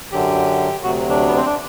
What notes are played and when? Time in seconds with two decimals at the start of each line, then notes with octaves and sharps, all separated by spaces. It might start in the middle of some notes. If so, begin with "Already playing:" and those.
0.12 F#2 D3 F#3 G4
0.83 D2 C3 F#3 F#4
1.10 D4
1.27 B3
1.36 C4
1.46 D4